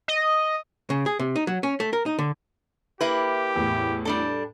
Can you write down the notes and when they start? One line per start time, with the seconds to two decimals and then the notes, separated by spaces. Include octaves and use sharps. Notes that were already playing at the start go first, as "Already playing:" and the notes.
0.08 D#5
0.90 C#3
1.06 G#4
1.19 C3
1.36 D#4
1.47 F#3
1.63 C#4
1.80 A3
1.93 A#4
2.06 D#4
2.19 D3
3.01 A#3 E4 G4 B4
3.56 E2 A2
4.05 G3 D4 A4